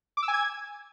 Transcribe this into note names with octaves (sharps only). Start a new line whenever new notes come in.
D6
E6
G#5
G#6